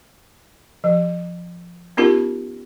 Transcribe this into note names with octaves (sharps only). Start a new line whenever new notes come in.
F3
B3 C#4 D#4 F4 G4 A#4